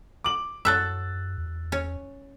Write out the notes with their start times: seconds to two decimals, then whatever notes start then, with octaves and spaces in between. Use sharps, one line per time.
0.24 D6 F#7
0.65 F#2 F#3 A4 E5 E6 F#6 A6
1.38 E2
1.72 C#4 C#5